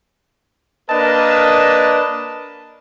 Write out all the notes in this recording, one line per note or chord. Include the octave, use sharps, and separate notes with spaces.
A#3 D4 A#4 B4 D#5 A5